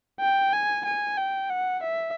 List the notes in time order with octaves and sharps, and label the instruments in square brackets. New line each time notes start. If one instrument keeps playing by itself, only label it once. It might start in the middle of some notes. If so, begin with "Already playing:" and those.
[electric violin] G5
G#5
G#5
G5
F#5
E5